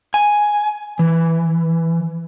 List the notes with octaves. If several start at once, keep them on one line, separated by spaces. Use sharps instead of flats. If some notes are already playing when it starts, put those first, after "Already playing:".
G#5
E3